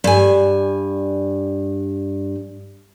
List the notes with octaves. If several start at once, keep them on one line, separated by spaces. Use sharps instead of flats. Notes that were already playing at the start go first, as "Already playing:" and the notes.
G2 G#5